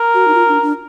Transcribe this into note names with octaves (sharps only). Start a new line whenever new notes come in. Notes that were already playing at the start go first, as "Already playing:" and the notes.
Already playing: A#4
F#4
D#4
F4
D4
D4